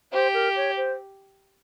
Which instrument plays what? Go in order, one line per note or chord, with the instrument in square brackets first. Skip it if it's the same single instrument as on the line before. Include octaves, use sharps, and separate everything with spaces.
[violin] G4 [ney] C5
[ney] A#4
C#5
C5